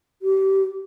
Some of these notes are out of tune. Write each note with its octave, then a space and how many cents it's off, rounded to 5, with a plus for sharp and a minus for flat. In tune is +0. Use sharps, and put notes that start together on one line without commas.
G4 -25